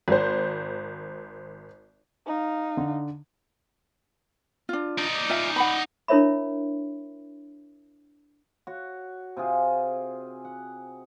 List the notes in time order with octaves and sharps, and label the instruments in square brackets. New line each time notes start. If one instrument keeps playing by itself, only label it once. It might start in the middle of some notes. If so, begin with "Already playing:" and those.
[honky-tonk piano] G#1 C5
[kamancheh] D#4 F5
[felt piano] D3
[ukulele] D4 F4
[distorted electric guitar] D#4 D5
[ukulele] F4 E5 G#5
F#5 B5
[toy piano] D4 E4 A#4 C#5 E5 B5
[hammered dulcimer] F#4 C#5
C3 F4 G#4
F#5